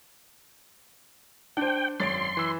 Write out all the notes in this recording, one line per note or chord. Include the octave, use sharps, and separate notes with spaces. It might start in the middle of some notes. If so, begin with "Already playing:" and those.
D4 C5 G5
G#1 F#2 C#5 C6 A6 D7
E3 B5 E6